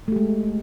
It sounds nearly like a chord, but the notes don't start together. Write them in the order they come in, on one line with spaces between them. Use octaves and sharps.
A3 G4 G#3